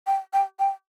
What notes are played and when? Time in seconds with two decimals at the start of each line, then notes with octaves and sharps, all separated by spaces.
0.07 G5
0.33 G5
0.59 G5